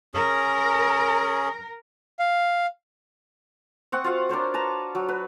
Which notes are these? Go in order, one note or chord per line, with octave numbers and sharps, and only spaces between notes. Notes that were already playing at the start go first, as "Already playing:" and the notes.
C#4 G#4 A#4
F5
C4 F#5 C#6 D#6
F4 F#4 F5 F#5
D4 A#4 C5 C#5
B4 A5 A#5
F#3
B4